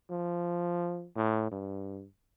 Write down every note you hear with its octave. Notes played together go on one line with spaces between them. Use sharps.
F3
A2
G2